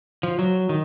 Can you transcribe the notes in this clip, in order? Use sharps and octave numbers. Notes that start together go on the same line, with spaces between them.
F3
F#3
D#3